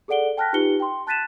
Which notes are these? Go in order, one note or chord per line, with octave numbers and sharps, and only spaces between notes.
G#4 A4 D5 F#5 D7 G7
G5 A5 F6 F#6 A#6 B6
D#4 F4 G4 B4 C#7 G7
G5 C6
A5 F#6 A6 B6 D#7 E7